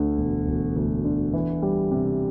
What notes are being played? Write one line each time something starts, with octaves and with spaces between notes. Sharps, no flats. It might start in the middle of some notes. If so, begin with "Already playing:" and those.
Already playing: D2 D3
E1
E1
D2
D3
E3
G3
C3